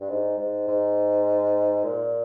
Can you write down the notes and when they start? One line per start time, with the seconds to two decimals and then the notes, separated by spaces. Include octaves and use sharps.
0.01 G2
0.10 G#2
0.38 G#2
0.68 G#2
1.84 A#2